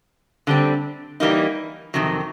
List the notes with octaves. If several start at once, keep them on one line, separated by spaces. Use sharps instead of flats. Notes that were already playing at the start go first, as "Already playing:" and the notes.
D3 G3 C4
E3 G3 A#3 D#4
F2 C3 D#3 F#3